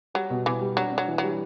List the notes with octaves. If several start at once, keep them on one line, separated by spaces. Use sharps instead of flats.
F#3 G3
B2
B2 E3
G3
F#3 D4
D4
F#3
E3
F#3 G3